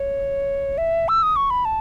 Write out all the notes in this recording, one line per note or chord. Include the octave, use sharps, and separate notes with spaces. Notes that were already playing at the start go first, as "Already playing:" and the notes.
Already playing: C#5
E5
E6
D#6
C#6
B5
A5